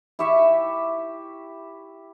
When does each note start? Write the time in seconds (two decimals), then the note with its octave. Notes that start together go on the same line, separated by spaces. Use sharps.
0.19 E4 G4 E5 C#6